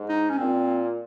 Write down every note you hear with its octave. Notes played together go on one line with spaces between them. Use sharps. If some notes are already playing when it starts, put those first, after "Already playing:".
Already playing: G#2
D#4
C#4
A#2 C4